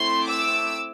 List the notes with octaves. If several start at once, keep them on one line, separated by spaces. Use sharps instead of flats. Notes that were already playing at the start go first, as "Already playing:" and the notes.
Already playing: A3 C4 E4 C6
D6 E6